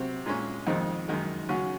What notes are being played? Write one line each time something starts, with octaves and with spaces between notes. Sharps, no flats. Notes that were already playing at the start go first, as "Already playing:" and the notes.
Already playing: C3 F#3 C4 F#4
A#2 G#3 C#4
F2 D#3 G#3 C4 D#4
F#2 D#3 G#3
C#3 F#3 C#4 F#4